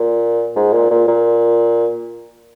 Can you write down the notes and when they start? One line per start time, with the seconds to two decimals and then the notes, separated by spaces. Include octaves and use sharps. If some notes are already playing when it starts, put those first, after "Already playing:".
Already playing: A#2
0.56 G#2
0.73 A#2
0.91 A#2
1.08 A#2